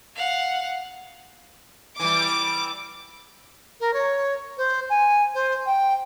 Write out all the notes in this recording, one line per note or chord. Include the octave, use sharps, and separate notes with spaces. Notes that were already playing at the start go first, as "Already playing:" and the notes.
F5 F#5
E3 G3 D6
A#4
C#5
C5
G#5
C5
G5